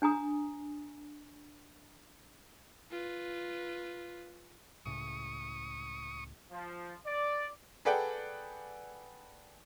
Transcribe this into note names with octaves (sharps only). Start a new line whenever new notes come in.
D4 G#5 A#5 D#6
F4 B4
C#2 A2 C#3 C#6 D#6
F3
D5
G#4 A4 B4 D5 F#5 G5